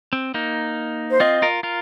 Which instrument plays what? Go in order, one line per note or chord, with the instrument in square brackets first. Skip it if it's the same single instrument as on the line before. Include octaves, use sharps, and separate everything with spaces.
[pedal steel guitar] C4
A#3 D#4
[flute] C5
[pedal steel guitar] C4 F4 [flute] D#5
[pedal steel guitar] F4 A#4
F4 A#4